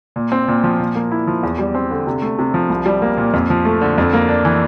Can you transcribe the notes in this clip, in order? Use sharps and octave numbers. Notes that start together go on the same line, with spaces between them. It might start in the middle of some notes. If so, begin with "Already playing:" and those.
A#2
C4
A#2
F3
A#2
A#3
E4
F3
E2
G3
C4
D3
C3
A3
C3
F3
C2
G3
A#3
A#2
F2
F3
A3
D3
F2
A#3
D4
E3